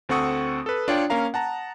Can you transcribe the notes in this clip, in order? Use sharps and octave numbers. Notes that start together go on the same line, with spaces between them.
D2 C4 A4 F#5 C#6 D#6
A4 B4
D4 F4 C#5 D5 G5
A#3 C#4 A#4 F5 A#5
F#5 A5 A#5